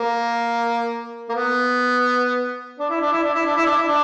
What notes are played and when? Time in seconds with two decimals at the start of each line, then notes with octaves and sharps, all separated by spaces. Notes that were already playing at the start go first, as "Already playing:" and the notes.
Already playing: A#3
1.29 A#3
1.34 B3
2.79 D4
2.90 E4
3.01 D4
3.12 E4
3.23 D4
3.34 E4
3.45 D4
3.56 E4
3.66 D4
3.78 E4
3.88 D4